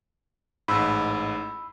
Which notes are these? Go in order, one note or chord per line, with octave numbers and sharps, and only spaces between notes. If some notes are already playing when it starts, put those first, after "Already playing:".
A1 G#2 B5 E6